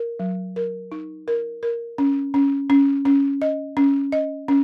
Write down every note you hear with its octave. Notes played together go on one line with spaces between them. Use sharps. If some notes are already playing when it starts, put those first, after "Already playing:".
Already playing: A#4
F#3
A#4
D#4
A#4
A#4
C#4
C#4
C#4
C#4
D#5
C#4
D#5
C#4